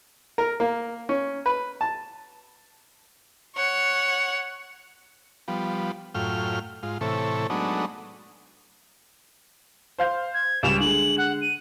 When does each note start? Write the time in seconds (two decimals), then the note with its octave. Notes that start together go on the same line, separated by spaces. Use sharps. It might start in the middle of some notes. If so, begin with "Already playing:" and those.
0.38 A#4
0.60 A#3
1.09 C#4
1.46 B4
1.81 A5
3.56 C#5 F#5
5.48 F3 G3 B3
6.15 F#2 A2 F4 G5 F6
6.83 G#2 F4
7.01 A2 C3 E3 A4 C#5
7.50 F#3 G#3 A3 B3 D4 D#4
9.98 C5 F5 G6
10.34 G#6
10.63 C#2 G3 E7 F7
10.80 D3 G#3 F#7
11.18 F#5
11.41 D#7